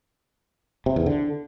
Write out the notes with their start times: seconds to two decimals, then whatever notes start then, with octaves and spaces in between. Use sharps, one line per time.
0.86 C3
0.96 E2
1.06 D3